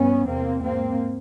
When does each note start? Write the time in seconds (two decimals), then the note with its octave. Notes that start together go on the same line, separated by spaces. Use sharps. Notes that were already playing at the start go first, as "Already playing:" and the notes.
Already playing: G2 B3 C#4
0.26 E2 C3 A#3 C4
0.63 G#2 A#3 C4